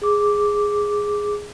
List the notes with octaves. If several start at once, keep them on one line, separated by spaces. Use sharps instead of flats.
G#4 D6